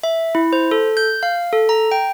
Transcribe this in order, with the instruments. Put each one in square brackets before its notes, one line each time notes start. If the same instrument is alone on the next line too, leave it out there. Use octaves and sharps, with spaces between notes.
[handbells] E5
E4
C5
A4
G6
F5
A4
A#5
G5